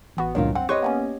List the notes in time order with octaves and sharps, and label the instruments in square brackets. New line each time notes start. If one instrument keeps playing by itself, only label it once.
[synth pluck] A1 B3 F#4
[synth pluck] C#2 G2 F#3 [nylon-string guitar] A#2 D#3 F4
[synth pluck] C4 [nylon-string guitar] F#5
[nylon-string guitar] G4 C#5 D#5 [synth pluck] B4 C6 C#6
[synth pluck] A#3 B3 C#4